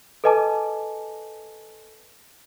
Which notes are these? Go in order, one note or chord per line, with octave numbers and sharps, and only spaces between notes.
A4 B4 D#5 G#5 A5 D6